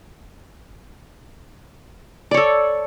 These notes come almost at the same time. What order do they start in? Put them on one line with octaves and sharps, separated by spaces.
D5 C#5 A4